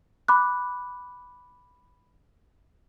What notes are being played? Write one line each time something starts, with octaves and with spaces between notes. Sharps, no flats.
B5 D6 F#6